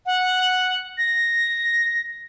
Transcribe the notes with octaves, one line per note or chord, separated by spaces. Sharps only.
F#5
A#6